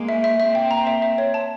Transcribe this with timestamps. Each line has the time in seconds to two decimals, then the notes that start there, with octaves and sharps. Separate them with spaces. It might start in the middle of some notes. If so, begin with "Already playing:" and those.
Already playing: G#3 A#3
0.09 E5
0.24 E5
0.39 A#3 C4 E5
0.55 G5
0.71 A#5
0.87 E5
1.02 E5
1.18 C#5
1.34 A5